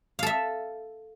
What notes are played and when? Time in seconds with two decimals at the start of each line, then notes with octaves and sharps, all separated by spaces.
0.19 F5
0.23 A4
0.26 E5